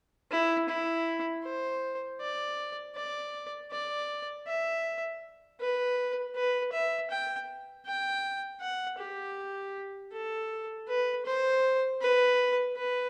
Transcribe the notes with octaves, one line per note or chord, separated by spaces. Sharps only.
E4
E4
C5
D5
D5
D5
E5
B4
B4
E5
G5
G5
F#5
G4
A4
B4
C5
B4
B4